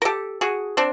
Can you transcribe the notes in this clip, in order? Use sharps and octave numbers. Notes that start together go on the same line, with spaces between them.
A#4
G4 A4
F#4 G#4
C4 D4